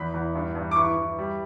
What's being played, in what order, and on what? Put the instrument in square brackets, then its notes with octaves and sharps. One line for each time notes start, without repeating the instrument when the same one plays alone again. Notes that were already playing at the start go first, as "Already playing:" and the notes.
Already playing: [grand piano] E2 B5
E2
G2
G2
D6
E3 C#6
E3
G3